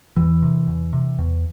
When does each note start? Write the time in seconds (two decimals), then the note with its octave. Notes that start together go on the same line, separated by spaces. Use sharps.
0.17 E2 E3
0.42 C3
0.68 E2
0.93 C3
1.19 E2